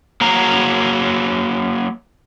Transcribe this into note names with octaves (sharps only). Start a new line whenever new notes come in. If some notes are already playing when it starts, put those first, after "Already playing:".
F#3 A#3 A#5